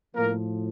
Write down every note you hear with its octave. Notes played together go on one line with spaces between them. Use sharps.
A2 F3 A#3 A#4